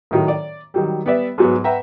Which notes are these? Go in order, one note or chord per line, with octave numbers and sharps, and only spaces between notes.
A2 D#3 F#3
D5
D#3 F#3 G3
G3 B3 B4 D5 E5
G#2 F#3 B3
B4 E5 F#5 G5 A#5